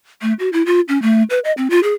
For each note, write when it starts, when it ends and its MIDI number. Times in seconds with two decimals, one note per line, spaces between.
0.22 0.33 57
0.39 0.49 66
0.53 0.66 64
0.66 0.81 65
0.89 1.01 61
1.02 1.23 57
1.30 1.39 71
1.45 1.52 75
1.57 1.68 60
1.70 1.80 65
1.83 1.93 68